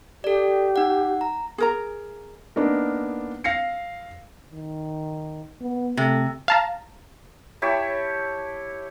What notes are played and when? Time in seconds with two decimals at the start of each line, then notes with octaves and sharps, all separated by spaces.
0.24 G4 A4 D5
0.76 D#4 F#5
1.21 A#5
1.58 G#4 A#4 A#5
2.56 A#3 B3 D4 D#4 A#4
3.44 F5 A#6 C7 C#7
4.51 D#3
5.61 B3
5.97 C3 A3
6.48 F5 A5 A#5
7.62 E4 G4 C#5 A5